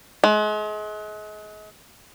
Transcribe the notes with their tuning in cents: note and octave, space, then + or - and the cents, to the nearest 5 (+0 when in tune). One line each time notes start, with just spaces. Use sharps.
G#3 +35